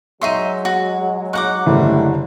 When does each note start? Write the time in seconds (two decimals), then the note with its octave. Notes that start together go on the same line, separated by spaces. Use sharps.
0.21 F#3 G#3 D#4 E5 C6 C#6 D#7
0.65 F#4
1.33 D#4 F#5 C#6 D6 F#6
1.67 F#1 A2 D3 G3